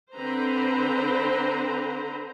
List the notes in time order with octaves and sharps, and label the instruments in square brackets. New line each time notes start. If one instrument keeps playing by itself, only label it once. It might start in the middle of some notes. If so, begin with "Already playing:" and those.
[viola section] D3 C4 B4 C5 A#5